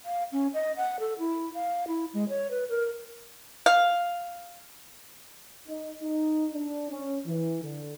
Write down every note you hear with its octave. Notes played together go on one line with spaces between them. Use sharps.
F5
C#4
D#5
F#5
A4
E4
F5
E4
G#3
C#5
B4
A#4
F5
D#4
D#4
D4
C#4
E3
D3